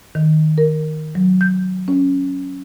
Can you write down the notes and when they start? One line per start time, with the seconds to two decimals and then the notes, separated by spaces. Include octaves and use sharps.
0.15 D#3
0.58 A#4
1.15 F#3
1.41 G6
1.88 C#4